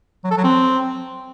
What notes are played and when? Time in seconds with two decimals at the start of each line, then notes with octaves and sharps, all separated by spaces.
0.24 F#3
0.31 A4
0.37 F#3
0.44 C4